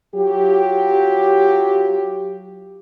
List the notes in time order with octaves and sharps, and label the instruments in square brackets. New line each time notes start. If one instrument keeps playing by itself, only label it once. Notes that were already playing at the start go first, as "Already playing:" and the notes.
[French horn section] F#3 F4 G4